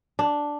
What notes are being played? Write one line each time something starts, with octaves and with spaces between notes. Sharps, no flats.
D4